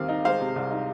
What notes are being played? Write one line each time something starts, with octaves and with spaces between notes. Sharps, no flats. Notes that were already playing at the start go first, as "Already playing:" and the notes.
Already playing: D#2 D#3 C4 F5
D#4
G#3 C5 F5
C3
C2
D#4